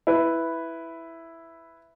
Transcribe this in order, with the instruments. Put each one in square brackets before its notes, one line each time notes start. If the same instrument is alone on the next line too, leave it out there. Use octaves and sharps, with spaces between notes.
[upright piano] E4 B4